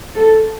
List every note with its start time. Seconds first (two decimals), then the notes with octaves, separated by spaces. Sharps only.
0.15 A4